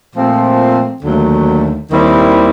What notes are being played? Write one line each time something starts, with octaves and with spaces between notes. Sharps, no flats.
A#2 F3 A3 C4
D#2 D3 F#3 A3
D#2 D#3 G3 C4 E4